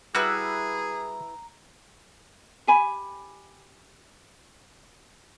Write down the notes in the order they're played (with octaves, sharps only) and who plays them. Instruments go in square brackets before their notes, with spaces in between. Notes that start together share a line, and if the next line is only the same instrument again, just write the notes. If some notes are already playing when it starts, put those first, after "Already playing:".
[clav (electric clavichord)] G3 F#4 [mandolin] E4 B4 F#6 [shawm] G#4 [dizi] A#5
[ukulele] G4 G#5 B5